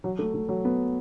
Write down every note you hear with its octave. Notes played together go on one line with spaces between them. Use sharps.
F#3
A3
A3
F#3
B3